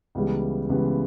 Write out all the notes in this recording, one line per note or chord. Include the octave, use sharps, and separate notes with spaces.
C#2 C#3 E3 G3 B3
C#2 C#3 E3 G3 B3